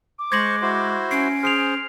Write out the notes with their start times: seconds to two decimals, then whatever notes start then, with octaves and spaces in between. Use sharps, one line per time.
0.19 D6
0.32 G#3 C5 C#6 G#6 A#6 F#7
0.62 E4 F#4 C5
1.11 C#4 C7 D7
1.43 G#4 C5 F6 C7 F7